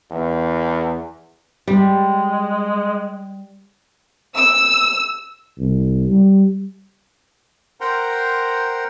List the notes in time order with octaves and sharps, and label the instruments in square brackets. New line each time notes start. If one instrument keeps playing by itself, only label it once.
[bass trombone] E2
[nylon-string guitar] G3 [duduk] G#3
[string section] E6
[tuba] C2
G3
[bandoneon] A#4 C5 F#5 G5 A#5 C6